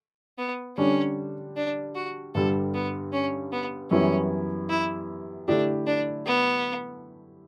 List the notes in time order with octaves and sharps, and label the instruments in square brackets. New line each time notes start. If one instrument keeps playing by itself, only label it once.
[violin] B3
[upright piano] D3 G3 D4 [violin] C#4
[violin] D4
F#4
[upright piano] G2 D3 G3 [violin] A4
[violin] B3
C#4
B3
[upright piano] F#2 E3 G3 B3 E4 [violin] C#4
[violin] E4
[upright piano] D3 A3 E4 G4 [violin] D4
[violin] D4
B3